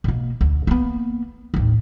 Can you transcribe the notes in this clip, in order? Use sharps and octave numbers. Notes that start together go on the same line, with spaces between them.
B2 A#3
D2
A#3 B3
A1 D#2